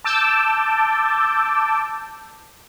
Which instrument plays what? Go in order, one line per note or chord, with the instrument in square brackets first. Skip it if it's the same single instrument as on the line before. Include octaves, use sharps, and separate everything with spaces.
[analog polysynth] A5 D6 E6 G6